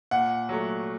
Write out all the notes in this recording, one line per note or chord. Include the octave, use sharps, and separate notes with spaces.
A#2 F#5
F#3 A3